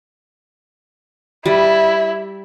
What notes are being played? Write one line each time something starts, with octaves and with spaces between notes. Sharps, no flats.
G3 E4